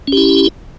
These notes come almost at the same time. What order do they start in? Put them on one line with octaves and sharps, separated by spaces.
C#4 G4 E4